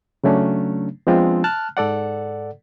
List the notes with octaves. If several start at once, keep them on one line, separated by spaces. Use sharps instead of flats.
C#3 F#3 A3 C#4 D4
F3 G#3 B3 C4 D4 F4
A5 F6 F#6
G#2 A4 D5 F#5